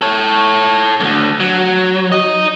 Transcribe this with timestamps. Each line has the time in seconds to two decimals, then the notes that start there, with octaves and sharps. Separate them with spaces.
0.02 A4 C#5
1.00 D2 G#2
1.40 F#3
2.12 D#4 D#5